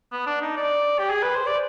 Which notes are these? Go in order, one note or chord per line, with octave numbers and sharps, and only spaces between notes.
B3
D4
D#4
D5
G4
G#4
B4
C5
D5